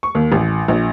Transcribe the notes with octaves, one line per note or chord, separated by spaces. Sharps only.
C#6
D#2
A1
A#1